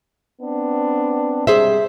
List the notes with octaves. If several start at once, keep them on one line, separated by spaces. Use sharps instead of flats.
B3 C4 D4
C3 G3 G#3 G#4 C5 E5